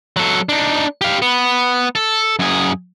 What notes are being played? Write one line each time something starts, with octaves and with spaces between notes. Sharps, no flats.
F#3 A4
D4 D#4
G4 F5
B3
A4
F#2 G#4